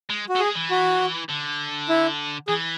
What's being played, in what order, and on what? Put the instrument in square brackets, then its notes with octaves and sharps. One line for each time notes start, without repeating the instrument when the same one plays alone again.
[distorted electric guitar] G#3
[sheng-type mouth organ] F#4
[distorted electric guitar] A3
[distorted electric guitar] G#3 [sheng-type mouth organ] G#4
[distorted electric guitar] E3
[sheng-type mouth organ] F#4
[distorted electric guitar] D3
[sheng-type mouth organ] E4
[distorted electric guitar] E3 [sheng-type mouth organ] G#4